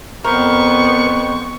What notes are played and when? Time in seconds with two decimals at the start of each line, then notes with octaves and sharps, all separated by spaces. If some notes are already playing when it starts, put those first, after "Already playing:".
0.24 F2 B3 A#4 C5 C#6